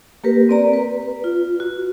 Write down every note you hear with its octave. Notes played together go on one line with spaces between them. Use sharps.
A#3 G4 A#4 B4
C4 D5 A#5
B4
F4
F#4